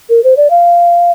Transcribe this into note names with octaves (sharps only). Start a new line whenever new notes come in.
A#4
C5
D5
F5